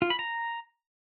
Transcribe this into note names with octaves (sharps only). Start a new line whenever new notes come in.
F4
B5
A#5